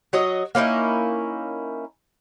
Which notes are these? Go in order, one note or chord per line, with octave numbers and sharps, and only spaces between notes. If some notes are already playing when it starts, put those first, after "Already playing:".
F#3 C#5 D#5
A#3 C#4 D#4 E4